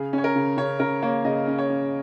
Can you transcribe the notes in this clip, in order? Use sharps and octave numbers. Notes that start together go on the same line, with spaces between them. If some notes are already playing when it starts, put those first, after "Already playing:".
Already playing: C#3 G#4
C#4
C#5
A#4
C#3
C#3 C#5
C#3 A#4
A#3 C#5
C#3 D#5
C#4
C#5
C#4